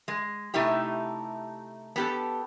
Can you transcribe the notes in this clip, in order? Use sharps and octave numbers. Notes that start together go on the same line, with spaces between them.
G#3
C3 A3 D#4 E4 G4
B3 G4 A4